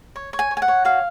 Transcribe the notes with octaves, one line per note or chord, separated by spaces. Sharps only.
C#5
C#5
G#5
C#5
G#5
F#5
C#5
F#4 F5